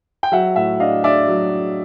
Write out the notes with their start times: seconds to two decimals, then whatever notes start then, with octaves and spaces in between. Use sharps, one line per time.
0.23 G5
0.32 F#3 E5 F#5
0.55 A2 E5 F#5
0.80 D4 D#5 F5
1.04 D4 D5 E5
1.28 F#3
1.51 D4